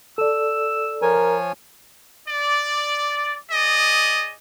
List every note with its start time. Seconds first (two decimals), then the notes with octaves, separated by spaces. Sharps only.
0.18 A4 D5 E6
1.02 F3 A#4 C#5 G#5
2.28 D5
3.51 G#4 D5 D#5